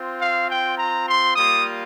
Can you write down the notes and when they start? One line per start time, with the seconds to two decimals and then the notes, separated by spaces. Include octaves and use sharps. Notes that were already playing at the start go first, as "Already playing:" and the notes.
Already playing: C4 F4
0.19 F5
0.49 G5
0.78 A#5
1.06 C6
1.36 G3 A#3 F4 D#6